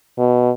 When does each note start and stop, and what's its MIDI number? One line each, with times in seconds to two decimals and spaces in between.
0.18 0.50 47